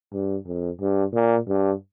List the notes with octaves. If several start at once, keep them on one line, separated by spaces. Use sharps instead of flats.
G2
F2
G2
A#2
G2